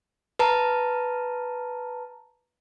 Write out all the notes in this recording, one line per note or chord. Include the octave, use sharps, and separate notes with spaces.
B4 A5 A#5